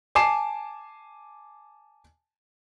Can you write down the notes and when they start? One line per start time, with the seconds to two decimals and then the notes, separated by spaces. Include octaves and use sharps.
0.15 G#5 A5 D6 C7 E7